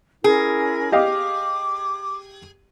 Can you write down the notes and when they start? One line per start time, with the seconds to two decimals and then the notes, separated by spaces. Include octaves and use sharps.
0.24 C#4 E4 G#4 A#4
0.92 G4 D#5 F5 D6